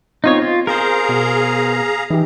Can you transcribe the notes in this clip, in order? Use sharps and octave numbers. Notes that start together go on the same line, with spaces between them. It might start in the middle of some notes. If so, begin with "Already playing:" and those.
B3 C4 D#4 F4 C#5 D#5
F4
G#4 A#4 C5 F5 A#5
B2
E3 D#4 G4